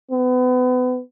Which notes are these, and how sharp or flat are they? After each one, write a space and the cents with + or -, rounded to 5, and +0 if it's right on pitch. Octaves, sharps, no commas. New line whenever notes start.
B3 +35